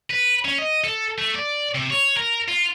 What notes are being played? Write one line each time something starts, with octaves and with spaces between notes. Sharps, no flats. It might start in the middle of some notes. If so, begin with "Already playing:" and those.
B4
C#4
D#5
A4
A3
D5
C3
C#5
A#4
F4